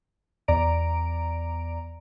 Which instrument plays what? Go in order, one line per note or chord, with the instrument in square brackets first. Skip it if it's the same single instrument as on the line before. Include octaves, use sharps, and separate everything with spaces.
[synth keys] E2 D5 A#5 D7